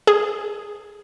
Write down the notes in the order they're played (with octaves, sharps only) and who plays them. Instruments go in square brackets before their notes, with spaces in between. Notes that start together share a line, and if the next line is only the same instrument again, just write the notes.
[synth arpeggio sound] G#4